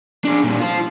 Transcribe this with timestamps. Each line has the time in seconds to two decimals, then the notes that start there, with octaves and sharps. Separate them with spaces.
0.25 D4 G#4
0.44 A#2 G3
0.60 F4 C5